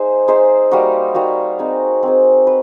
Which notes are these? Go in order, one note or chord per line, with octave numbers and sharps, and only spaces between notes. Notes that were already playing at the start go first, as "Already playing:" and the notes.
Already playing: D#4 G#4 C5 E5
D#4 G#4 C5 E5
G3 A#3 D#4 F#4
G3 A#3 D#4 F#4
C4 D#4 G#4
C4 D#4 G#4
B4